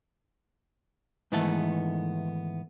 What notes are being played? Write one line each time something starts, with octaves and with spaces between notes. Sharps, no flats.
G#2 D#3 E3 A3 B3 A4